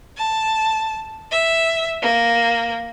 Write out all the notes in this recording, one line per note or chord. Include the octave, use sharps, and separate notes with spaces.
A5
E5
A#3